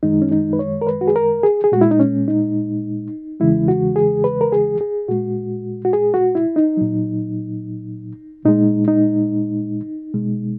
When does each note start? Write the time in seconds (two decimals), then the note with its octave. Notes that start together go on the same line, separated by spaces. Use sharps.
0.03 F#2 D#3 G#3 D#4
0.22 C#4
0.31 D#4
0.53 B4
0.59 C#5
0.82 A#4
0.87 B4
1.01 F#4
1.08 G#4
1.16 A#4
1.43 G#4
1.64 G#4
1.72 A#2 G#3 F#4
1.81 E4
1.91 D#4
2.00 C#4
2.28 D#4
3.40 E2 C#3 E3 G#3 E4
3.68 F#4
3.96 G#4
4.24 B4
4.41 A#4
4.52 G#4
4.81 G#4
5.08 A#2 G#3 F#4
5.85 F#4
5.93 G#4
6.14 F#4
6.35 E4
6.56 D#4
6.77 A#2 F#3
8.45 A#2 G#3 D#4
8.88 D#4
10.14 B2 G#3